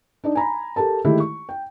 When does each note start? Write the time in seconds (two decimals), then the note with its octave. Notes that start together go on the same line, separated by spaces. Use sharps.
0.24 D4 D#4 D5
0.35 G#5 A#5 B5
0.76 G4 A4 A#4 A5
1.05 D#3 G#3 A3 E4 G4
1.20 C#6
1.49 G5